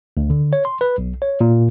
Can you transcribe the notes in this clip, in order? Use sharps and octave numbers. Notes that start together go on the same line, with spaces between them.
D2
D3
C#5
C6
B4
B1
C#5
A#2